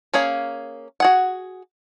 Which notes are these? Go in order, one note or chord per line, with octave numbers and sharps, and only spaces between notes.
A#3 C#4 G#4 F5
F#4 G#4 F#5